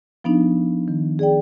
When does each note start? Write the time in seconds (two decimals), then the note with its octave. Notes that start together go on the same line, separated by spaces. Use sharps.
0.24 F3 B3 D4 D#4
0.88 D#3
1.19 G#4 D5 G5